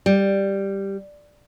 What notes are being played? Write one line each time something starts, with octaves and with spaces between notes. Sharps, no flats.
G3